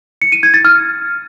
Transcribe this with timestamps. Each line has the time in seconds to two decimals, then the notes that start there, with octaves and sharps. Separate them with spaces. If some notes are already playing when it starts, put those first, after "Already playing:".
0.22 C#7
0.32 D#7
0.43 G#6
0.54 A6
0.65 F6